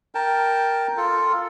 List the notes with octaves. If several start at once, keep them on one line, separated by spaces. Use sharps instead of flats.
A#4 G5 A5
F4 A4